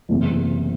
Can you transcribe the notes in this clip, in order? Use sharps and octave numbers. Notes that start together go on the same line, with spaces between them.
F#1 E2 C3